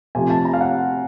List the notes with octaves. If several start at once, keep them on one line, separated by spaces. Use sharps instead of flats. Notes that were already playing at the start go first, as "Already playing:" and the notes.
C3 F3 A3 G#5
A5
A#5
F5
F#5